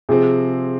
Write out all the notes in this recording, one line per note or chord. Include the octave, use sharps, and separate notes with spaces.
C3 F3 C4 G#4